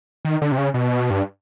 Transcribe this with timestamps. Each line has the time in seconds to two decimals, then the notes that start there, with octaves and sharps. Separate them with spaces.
0.25 D#3
0.42 D3
0.52 C3
0.58 C#3
0.74 B2
1.10 G2